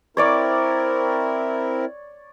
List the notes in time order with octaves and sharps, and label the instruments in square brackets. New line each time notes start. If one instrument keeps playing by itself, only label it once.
[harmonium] C4 E4 A#4 [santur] C#5 D5 D6